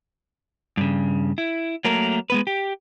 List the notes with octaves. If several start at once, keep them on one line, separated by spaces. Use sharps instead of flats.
G2 C#3
E4
F#3 A3 A#3 A#4
G#3 B3 B4
G4